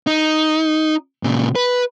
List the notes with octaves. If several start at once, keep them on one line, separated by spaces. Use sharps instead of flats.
D#4
A#2 C#3
B4